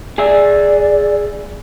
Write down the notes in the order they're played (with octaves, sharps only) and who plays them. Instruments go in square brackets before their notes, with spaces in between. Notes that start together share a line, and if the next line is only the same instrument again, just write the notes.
[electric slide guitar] G#4 E5 [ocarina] D5